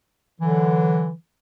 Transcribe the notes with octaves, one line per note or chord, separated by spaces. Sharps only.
D3 E3 F#3